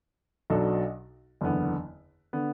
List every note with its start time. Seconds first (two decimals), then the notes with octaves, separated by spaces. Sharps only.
0.50 B1 B2 F#3 D4 A4
1.41 F#1 E2 D3 B3
2.33 D3 B3